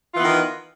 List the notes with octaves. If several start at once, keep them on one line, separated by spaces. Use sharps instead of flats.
D#3 E3 B3 F4